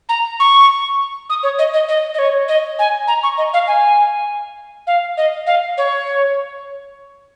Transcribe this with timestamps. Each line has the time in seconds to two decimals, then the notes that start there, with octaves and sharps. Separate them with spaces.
0.09 A#5
0.40 C#6
1.29 D#6
1.43 C#5
1.59 D#5
1.73 D#5
1.88 D#5
2.14 D#5
2.19 C#5
2.48 D#5
2.79 G#5
3.07 A#5
3.23 C#6
3.38 D#5
3.54 F5
3.68 G#5
4.87 F5
5.17 D#5
5.46 F5
5.78 C#5